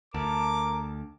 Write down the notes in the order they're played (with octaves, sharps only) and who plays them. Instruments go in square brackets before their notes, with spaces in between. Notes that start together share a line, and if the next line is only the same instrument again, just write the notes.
[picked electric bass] D2 [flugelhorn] A#4 [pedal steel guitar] A5 [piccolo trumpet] D6